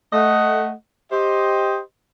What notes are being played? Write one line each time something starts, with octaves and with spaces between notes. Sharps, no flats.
A3 D#5 F#5
G4 C5 D#5